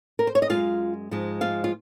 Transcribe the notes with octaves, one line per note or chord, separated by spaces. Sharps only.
A#4
C5
C#5
D#5
F#2 F3 G#3 F4 F5
G#2 F3 G#3
F4 F5
F4